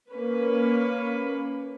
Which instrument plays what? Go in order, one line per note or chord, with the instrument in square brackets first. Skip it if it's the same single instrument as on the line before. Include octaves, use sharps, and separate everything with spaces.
[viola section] A#3 C#4 B4